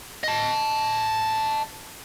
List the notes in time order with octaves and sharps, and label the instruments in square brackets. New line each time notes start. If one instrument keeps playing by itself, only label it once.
[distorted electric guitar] D#5 A5